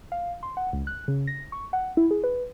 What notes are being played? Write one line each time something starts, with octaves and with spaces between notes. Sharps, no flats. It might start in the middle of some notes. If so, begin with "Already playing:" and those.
F5
C6
F#5
C#2
F#6
C#3
A#6
C#6
F#5
E4
G#4
B4